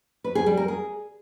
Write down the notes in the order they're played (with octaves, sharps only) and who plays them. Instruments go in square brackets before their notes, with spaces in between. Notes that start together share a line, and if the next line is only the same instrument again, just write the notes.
[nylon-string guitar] B4
G#4
G3
A#4
G#4